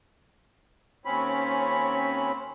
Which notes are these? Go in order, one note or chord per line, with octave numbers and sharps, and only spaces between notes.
D#2 C4 C#4 B5